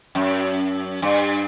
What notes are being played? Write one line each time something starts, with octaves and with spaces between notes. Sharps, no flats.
F#2
G2